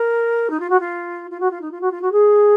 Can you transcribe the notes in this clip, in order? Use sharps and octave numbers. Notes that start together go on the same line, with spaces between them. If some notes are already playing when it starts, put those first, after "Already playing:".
Already playing: A#4
D#4
F4
F#4
F4
F4
F#4
F4
D#4
F4
F#4
F4
F#4
G#4